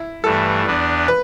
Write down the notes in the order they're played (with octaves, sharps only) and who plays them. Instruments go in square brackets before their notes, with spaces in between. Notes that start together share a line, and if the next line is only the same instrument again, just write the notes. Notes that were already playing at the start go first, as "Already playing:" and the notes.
Already playing: [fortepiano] E4
[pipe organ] G2 E3 A3 [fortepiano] A4
[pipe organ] E2 E3 B3 D4
[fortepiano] B4